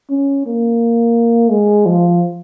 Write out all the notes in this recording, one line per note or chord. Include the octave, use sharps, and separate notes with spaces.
C#4
A#3
G#3
F3